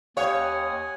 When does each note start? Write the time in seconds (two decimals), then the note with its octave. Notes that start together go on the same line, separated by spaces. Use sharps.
0.17 D#2 G4 C#5 F5 F#5 G#5 D#6